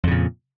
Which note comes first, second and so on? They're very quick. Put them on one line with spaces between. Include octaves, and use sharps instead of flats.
F2 C#3 A#2